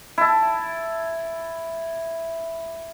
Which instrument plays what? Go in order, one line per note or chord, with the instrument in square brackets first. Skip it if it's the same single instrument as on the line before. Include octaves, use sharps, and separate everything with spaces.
[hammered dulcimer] E4 A5